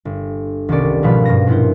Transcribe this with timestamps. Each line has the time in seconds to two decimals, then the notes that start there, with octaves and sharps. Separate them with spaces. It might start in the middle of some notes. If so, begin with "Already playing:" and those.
0.05 G1
0.69 C2 D#3 G3 B3 C#4 D5
1.03 G#1 B2 F3 B4 F5 B5
1.25 G2 A#6
1.47 A#2 B3 E4 C5